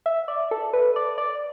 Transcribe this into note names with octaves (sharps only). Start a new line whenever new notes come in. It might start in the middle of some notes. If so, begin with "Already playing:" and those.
E5
D5
A4
B4
D5
D5